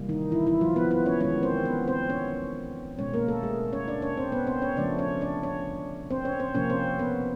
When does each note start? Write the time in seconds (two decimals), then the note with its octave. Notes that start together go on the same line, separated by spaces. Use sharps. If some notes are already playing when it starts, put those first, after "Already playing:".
Already playing: C3 E3 G3 A#3
0.09 D#3 D#4
0.32 E3 E4
0.47 E3 E4
0.61 F3 F4
0.76 B3 B4
0.91 B3 B4
1.06 C#4 C#5
1.21 D#3 G#3 C#4 C#5
1.43 C4 C5
1.65 B3 B4
1.87 C4 C5
2.09 C#4 C#5
2.99 B2 G#3 C#4 C#5
3.14 A#3 A#4
3.28 A3 A4
3.43 G#3 G#4
3.73 C#4 C#5
3.88 D4 D5
4.02 C#4 C#5
4.17 C4 C5
4.32 B3 B4
4.47 C4 C5
4.62 C#4 C#5
4.76 C#3 F3 A3 D4 D5
4.99 C#4 C#5
5.21 D4 D5
5.43 C#4 C#5
6.11 C4 C5
6.25 C#4 C#5
6.40 C4 C5
6.55 C3 F3 A#3 C#4 C#5
6.70 C4 C5
6.99 B3 B4